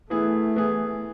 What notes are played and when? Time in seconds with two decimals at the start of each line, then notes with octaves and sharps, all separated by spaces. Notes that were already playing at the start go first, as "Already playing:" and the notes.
0.10 E3 A3 B3 E4 G#4
0.56 E3 B3 E4 G#4